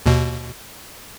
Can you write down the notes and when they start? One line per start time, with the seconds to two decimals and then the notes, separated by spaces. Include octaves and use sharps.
0.06 D#2 B2